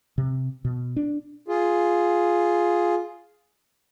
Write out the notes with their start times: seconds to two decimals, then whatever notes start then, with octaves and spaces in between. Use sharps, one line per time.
0.18 C3
0.65 B2
0.96 D4
1.48 F4 G#4